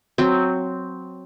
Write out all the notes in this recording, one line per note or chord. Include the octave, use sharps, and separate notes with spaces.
F#3 C4